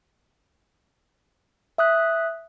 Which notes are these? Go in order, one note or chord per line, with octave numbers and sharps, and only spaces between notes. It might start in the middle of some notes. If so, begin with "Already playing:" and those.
E5 D#6 F#6